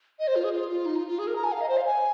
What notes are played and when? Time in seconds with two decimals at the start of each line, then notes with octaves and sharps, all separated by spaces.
0.19 D#5
0.28 C5
0.36 F4
0.44 G#4
0.52 F4
0.69 F4
0.86 D#4
0.96 F4
1.07 F4
1.19 G#4
1.27 A#4
1.36 A#5
1.44 G#5
1.52 F5
1.61 D#5
1.69 C5
1.77 F5
1.85 G#5